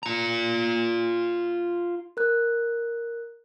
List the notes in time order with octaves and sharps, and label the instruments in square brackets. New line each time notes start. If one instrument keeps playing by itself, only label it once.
[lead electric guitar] F4 A#5
[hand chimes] A#4 F#6